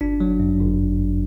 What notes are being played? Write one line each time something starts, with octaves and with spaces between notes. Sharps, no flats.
G1 D4
F#3
F#2
G1